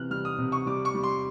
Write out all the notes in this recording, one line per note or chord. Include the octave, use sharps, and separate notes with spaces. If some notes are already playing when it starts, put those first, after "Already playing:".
Already playing: C3 E3 F6 F#6
G3 F6
D#6
C3
C#6
G3 D6
C#6
G3
C6